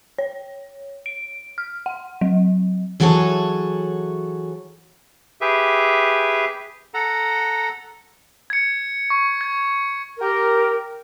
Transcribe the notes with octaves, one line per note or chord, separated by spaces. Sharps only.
C#5
D7
F6
F#5
F#3
E3 F#3 F#4 G#4 A4 C#5
G4 G#4 B4 E5
A4 F#5 A#5
G#6 C#7
C#6
G#6
G4 A#4